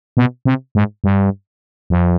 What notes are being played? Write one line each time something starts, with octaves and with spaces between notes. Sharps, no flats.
B2
C3
G#2
G2
F2